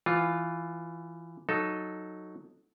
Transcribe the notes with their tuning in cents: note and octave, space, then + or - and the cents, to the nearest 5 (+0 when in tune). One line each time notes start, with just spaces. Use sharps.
E3 +15 F4 +0
F#3 +0 D#4 +0 A4 +0